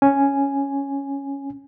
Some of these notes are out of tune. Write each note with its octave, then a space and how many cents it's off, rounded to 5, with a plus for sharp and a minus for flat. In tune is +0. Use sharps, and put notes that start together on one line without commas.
C#4 +0 G#5 +0